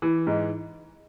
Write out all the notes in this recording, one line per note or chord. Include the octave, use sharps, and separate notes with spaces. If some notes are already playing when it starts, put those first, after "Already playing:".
E3
G#2